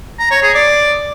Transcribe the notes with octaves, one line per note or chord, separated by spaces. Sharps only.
A#5
C#5
G#4
D5